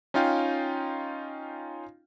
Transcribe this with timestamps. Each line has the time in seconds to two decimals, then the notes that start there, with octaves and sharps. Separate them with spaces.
0.14 C#4 D#4 F4 F5 G5